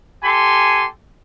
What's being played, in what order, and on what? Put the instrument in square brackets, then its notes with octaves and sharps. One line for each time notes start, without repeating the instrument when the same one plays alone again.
[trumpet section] G4 A4 G#5 C6